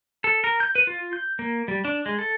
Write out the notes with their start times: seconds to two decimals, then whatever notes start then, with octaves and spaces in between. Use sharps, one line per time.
0.24 A4
0.44 A#4
0.60 G6
0.75 B4
0.87 F4
1.13 G6
1.39 A#3
1.68 G3
1.85 D4
2.06 G#3
2.19 A4